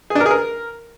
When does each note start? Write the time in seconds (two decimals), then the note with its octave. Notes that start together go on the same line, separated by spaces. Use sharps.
0.10 G#4
0.15 D4
0.20 A#4
0.26 G#4
0.31 A#4